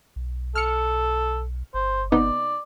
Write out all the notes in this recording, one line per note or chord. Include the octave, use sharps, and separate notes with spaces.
B1
A4 F6 C#7
G1 C5
C3 B3 D#4 D5